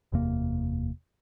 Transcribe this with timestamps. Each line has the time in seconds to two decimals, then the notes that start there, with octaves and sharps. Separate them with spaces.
0.12 F#1 E2 C3 A#3